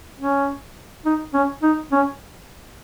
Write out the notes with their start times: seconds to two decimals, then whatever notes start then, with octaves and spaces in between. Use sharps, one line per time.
0.20 C#4
1.06 D#4
1.34 C#4
1.63 D#4
1.92 C#4